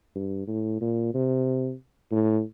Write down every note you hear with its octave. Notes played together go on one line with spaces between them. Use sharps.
G2
A2
A#2
C3
A2